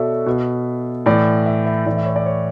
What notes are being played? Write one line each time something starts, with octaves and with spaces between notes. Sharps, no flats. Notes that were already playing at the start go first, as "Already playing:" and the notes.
Already playing: B2 F#4 A4 C#5 D5 E5
B2
A2 E3 D5
E5
E5
A2 E3 D5
E5
C#5
D5
C#5